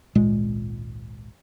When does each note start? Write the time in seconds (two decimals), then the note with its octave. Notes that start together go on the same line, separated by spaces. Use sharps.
0.15 G#1 C#2 A#2 G#3